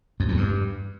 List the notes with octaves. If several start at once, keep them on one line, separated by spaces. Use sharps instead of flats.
F2
E2
G2